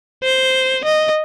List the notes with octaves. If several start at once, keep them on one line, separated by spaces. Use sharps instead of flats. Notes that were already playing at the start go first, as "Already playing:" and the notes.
C5
D#5